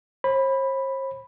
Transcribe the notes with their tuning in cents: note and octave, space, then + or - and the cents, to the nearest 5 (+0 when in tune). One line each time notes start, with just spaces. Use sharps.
C5 +45 B5 +0